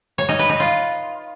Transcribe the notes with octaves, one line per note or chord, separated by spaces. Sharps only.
C#5
D#4
B4
D#4
F4